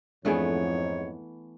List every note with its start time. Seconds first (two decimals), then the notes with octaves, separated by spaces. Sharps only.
0.25 F2 G#2 E3 A3 B3 D4 G#4 C#5